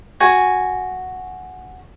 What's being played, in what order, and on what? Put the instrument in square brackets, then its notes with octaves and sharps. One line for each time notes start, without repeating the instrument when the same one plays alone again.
[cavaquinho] F#4 G#5